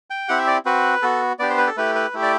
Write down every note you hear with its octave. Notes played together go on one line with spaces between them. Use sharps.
G5
C4 E4 G4 F#5
E5
D5
C4 F#4 B4
B3 F#4 A4
B3 D4 G4 D5
C5
B4
A4
A3 E4 G4 B4
B4
A3 E4 G4
D5